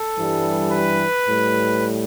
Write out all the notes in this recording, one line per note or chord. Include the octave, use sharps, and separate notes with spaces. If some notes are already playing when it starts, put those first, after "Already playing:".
Already playing: A4
G2 E3 G3
B4
A2 G3